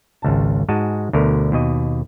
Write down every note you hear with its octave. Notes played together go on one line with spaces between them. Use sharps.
G#1 C#2 A5
G#2 G#3 F#4 D#5 A5
D2 B2 D3 A#4
D#2 B2 D#5